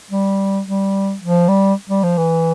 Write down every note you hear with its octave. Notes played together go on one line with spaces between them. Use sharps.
G3
G3
F3
G3
G3
F3
E3